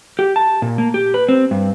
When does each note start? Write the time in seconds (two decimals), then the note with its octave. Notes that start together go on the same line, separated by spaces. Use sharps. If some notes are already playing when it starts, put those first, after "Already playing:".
0.19 G4
0.36 A5
0.62 A#2
0.78 A#3
0.94 G4
1.14 B4
1.29 C4
1.51 G2